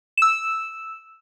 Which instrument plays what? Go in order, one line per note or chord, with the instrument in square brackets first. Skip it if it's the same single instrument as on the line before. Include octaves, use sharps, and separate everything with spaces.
[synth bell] E6 E7